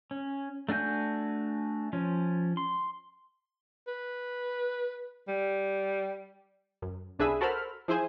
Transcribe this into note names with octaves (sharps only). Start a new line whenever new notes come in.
C#4
A3 D4 F#4 G#5 G6
F3 C#4
C6
B4
G3
F#2
C2 D4 G#4 B4 E5 D#6
F#4 A4 A#4 C5 B5 F6
F3 E4 G#4 C5 G#5